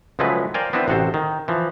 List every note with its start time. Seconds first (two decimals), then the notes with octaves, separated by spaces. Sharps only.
0.19 C#2 F3 F#3 G#3 A3 B4
0.54 A#4 C5 D5 F5 G5 G#5
0.73 B3 C4 D4 E4 B4
0.88 A1 C3 F#4 A4 C5
1.14 D#3
1.48 E3 F3